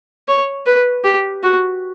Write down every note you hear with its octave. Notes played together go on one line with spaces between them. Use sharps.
C#5
B4
G4
F#4